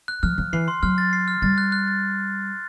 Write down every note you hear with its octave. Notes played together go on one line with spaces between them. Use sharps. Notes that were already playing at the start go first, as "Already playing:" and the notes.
F#6
F3 F6
F3 F6
E3 C7
C6
F#3 F6
A6
C7
F6
G3 A6
F#6
F#6
A6